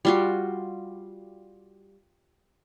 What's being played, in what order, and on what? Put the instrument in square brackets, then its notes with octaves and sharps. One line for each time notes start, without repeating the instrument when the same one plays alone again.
[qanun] G3 F4 F#4